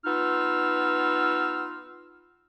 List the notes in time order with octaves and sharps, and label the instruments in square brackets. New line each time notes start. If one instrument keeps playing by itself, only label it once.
[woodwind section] B3 D#4 F4 E6 F6